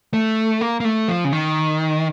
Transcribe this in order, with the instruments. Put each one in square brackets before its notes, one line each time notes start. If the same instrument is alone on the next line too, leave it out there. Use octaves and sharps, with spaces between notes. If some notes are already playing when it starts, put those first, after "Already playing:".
[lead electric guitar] A3
A#3
A#3
A3
F3
C#3
D#3